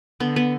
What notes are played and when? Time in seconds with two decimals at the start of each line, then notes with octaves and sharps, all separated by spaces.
0.20 D3 B3
0.36 B3